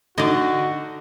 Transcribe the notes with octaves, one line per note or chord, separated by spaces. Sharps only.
D3 D#4 F#4 D5 D#5